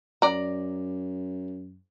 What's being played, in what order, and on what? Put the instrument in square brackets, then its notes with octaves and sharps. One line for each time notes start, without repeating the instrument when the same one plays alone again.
[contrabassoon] F#2 [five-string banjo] D5 A#5